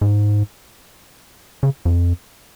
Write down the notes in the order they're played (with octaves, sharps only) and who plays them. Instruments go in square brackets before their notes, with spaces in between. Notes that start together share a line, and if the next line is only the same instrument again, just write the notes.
[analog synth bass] G#2
C#3
F2